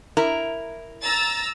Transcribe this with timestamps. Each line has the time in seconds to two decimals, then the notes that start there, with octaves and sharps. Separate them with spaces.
0.17 E4 A#4
1.03 A#5 E6 A6